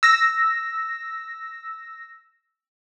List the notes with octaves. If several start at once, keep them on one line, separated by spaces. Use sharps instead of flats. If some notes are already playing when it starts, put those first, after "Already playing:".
E6 A#6